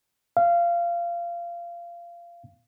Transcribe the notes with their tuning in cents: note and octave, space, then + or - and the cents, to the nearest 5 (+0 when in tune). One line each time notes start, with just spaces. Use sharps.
F5 -20